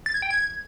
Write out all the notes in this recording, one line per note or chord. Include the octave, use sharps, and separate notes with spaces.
A6
G#6
G5
G#6